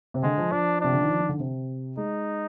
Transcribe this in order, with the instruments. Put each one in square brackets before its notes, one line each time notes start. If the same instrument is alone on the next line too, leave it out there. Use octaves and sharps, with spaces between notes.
[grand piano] C3
[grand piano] D3 [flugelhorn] G#3
[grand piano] F3
[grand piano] F3 [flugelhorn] D4
[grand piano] C3 [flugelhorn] D4
[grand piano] D3
D#3
F3
D#3
D3
C3
[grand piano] G#3 [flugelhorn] D#4